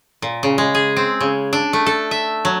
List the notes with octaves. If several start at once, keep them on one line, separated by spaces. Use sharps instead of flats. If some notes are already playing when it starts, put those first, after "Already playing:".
A#2
C#3
G#3
G#4
C4
C#3
D4
A3
A4
E5
F#3